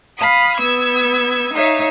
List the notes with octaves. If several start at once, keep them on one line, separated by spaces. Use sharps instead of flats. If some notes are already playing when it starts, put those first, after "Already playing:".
F5 B5 D#6
B3 E6 G#6
D#4 C#5 E5 F5